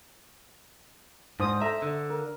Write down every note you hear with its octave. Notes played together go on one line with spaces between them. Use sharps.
G#2 D4 C5 D#6
A4 E5 A#5
D3
A#4